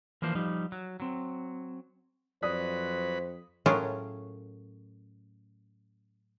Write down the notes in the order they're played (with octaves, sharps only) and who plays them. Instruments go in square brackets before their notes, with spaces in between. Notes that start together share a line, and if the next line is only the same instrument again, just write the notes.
[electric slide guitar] E3 F3 A#3 D4 C5
F3 G3 D#4
F#3
F#3 C4
[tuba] F2 [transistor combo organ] F#3 B4 B5 [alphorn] C5 [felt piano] D5 D#6
[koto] A2 F#3 C#4 F4 G#4 A#4